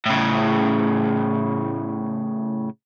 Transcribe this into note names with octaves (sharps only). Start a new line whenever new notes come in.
A2 C#3